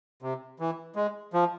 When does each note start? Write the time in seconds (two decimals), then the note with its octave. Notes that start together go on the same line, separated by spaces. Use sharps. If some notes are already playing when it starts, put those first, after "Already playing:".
0.22 C3
0.60 E3
0.96 G#3
1.33 F3